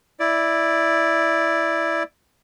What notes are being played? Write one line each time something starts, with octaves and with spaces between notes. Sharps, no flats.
E4 D5